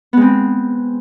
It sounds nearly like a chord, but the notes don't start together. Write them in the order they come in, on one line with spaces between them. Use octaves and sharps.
B3 G#3 C4